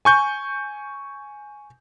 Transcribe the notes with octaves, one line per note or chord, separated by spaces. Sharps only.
G#5 C#6 G6